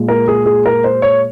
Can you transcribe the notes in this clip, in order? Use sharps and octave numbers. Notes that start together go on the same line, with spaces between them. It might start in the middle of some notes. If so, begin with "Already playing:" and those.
Already playing: A#2 G#3
A#4
G#4
G#4
A#4
C5
C#5